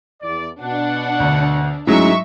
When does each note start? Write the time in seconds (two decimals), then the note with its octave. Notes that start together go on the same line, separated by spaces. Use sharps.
0.22 E2 D5
0.60 B2 D4 F#5
1.20 D2
1.87 G#2 F#3 G#3 A3 C#4 E4 E5 C#6